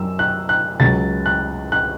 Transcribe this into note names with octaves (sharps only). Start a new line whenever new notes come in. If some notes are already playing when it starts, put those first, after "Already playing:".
Already playing: F#2 E6
F#6
F#6
C#2 C#3 F#3 A6
F#6
F#6